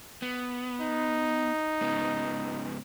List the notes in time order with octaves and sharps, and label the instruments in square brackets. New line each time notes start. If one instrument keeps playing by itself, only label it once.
[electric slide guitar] B3
[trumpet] D#4
[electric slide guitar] G#2 C#3 B3